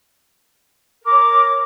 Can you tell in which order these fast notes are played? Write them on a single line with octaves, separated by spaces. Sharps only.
A#4 D6 C#5